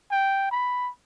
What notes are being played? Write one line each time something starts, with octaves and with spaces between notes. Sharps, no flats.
G5
B5